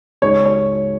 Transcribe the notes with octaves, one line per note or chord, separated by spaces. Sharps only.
C#2 C#3 G#3 D#4 G#4 C#5
C#5